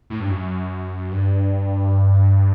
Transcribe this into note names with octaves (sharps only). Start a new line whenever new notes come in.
A2
G2
F#2
G2